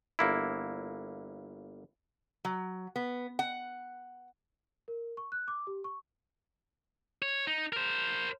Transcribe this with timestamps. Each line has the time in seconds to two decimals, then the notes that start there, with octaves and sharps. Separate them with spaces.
0.19 G1 A#3 E4
2.45 F#3
2.96 B3
3.39 F#5
4.88 A#4
5.17 C#6
5.32 F#6
5.48 D6
5.67 G4
5.84 C#6
7.22 C#5
7.47 D#4
7.73 A#4 C5